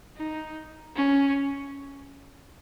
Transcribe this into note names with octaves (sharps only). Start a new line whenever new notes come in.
D#4
C#4